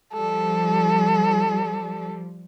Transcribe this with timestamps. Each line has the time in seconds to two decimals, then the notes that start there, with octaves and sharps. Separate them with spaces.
0.13 F3 G3 A4